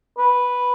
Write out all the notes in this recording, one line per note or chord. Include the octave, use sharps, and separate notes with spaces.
B4